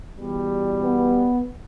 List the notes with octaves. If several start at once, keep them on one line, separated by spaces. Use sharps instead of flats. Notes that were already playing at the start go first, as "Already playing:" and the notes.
E2 B2 G3
B3